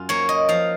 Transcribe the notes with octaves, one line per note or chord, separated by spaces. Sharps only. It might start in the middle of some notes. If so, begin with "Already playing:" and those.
Already playing: F#2 F4
A#3 C#5
D#5
F3 F5